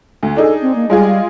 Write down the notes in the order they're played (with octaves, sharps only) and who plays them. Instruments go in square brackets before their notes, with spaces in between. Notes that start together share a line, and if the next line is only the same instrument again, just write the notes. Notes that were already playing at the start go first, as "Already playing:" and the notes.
[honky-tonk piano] D2
[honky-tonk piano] D4 D#4 G#4 [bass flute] A4
[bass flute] C4
A#3
[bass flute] G3 [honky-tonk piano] G#3 F4 G#4